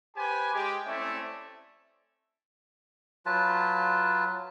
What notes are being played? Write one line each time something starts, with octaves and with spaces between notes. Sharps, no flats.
G4 B4 C5 G#5
G#3 G4
A3 C4 C#4 E4 D5 E5
F#3 F4 B4 A5